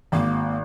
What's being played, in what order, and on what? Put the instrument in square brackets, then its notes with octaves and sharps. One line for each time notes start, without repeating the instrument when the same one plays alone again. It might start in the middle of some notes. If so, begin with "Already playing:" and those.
[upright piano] G#1 [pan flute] A#3